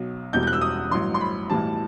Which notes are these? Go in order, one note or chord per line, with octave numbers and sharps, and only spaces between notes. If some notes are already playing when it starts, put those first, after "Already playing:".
Already playing: B1 B2 F#3
E1 E2 B2 G3 G6
G6
F#6
E6
D#6
A1 G2 F#3 C6
C6
B5
B1 A2 E3 G3 A5